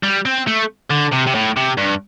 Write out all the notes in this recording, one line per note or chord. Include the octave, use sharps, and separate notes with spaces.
G3
C4
A3
D3
C3
C3
A2
C3
G2